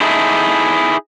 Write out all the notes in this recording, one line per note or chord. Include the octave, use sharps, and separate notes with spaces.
D#4 E4 G#4 A4